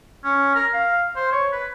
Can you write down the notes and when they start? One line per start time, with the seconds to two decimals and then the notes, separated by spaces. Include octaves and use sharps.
0.24 C#4
0.55 A#4
0.73 F5
1.16 C5
1.32 C#5
1.52 B4